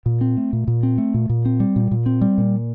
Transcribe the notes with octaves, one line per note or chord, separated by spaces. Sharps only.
A#2
C4
A3
A#2
A#2
C4
A3
A#2
A#2
C4
G3
A#2
A#2
C4
G3
A#2